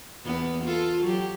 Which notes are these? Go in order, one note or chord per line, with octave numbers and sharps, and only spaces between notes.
E2 B3
F4 A4
F#3 G4